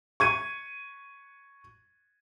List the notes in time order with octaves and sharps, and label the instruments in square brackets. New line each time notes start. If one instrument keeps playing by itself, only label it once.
[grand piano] C#6 G#6 D#7